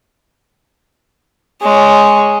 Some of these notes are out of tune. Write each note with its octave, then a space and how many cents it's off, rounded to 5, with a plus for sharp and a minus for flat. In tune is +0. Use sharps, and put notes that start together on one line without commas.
G#3 +0 C#5 +5